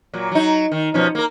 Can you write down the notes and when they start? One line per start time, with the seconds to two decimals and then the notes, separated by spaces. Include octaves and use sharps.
0.13 A#2 F#3
0.31 F#3 D#4
0.72 D#3
0.94 B2 F3 C#4
1.15 A#3 A#4